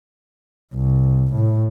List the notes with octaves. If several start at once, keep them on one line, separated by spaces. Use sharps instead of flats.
C2
A2